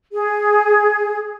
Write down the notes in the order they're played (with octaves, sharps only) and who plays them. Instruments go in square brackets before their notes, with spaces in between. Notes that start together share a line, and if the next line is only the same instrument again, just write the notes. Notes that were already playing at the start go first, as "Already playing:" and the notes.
[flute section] G#4